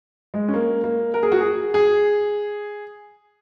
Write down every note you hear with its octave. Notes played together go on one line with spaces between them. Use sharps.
G#3
C#4
A#3
A#3
A#4
G#4
F#4
G#4
G#4